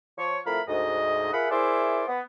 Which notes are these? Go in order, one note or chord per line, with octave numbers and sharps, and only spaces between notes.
F3 C#5
F2 A3 E4 A#4 F5 B5
D2 G#2 D#5
F4 G#4 A#4 E5 F#5 B5
E4 G#4 A#4 C5 D5 E5
B3